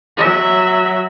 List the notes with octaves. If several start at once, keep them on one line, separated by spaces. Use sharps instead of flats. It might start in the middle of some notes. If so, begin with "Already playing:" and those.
F#3 E5